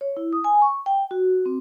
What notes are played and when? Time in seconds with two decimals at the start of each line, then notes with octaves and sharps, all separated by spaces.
0.01 C#5
0.17 E4
0.33 D#6
0.44 G#5
0.62 C#6
0.86 G5
1.11 F#4
1.46 C4